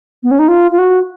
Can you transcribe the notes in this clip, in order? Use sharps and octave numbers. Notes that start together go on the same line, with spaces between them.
B3
C#4
D#4
F4
F4
F#4